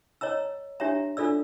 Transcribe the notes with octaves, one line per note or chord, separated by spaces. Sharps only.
C#5 D#5 A#5 E6
D4 G4 C#5 E5 A#5
D4 F4 A4 D5 E6